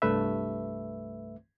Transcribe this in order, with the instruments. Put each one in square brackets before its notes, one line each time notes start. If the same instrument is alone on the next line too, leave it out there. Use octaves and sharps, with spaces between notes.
[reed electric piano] C2 G2 A3 B4 E5